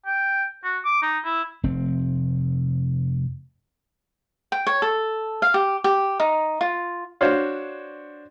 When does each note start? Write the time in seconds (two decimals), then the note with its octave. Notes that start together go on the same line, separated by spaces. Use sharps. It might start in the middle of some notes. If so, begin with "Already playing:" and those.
0.06 G5
0.64 F#4
0.84 D6
1.02 D#4
1.24 E4
1.63 F1 C4
4.52 G5
4.67 C#5
4.82 A4
5.42 F5
5.54 G4
5.84 G4
6.20 D#4
6.61 F4
7.21 D4 F#4 C5 C#5 F5